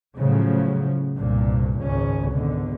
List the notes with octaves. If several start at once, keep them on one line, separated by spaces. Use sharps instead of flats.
A2 C#3 F3 F#3
C2 G2 A#2
G#1 C#2 C#4
G#1 B2 D3